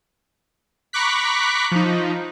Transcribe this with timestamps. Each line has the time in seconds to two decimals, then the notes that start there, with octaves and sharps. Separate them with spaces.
0.93 A#5 B5 C#6 D6 F#6 B6
1.72 F3 D#4